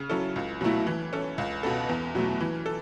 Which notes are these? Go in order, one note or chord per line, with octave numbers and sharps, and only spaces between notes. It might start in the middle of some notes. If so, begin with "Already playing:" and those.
Already playing: C#3
F#3 C#4 E4 A4
C#2
B2 F#3 A3 E4
E3
C#4 A4
C#2
B2 B3 A4
E2
B2 F#3 A3
E3
A4